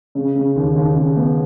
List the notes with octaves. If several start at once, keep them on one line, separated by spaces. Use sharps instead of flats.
C#3
C#3
D#2
D#2
C#3
B3